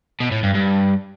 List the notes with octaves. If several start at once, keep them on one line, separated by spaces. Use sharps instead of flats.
B2
A2
G2
G2